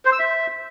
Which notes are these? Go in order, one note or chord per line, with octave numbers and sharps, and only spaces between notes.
C5
E6
E5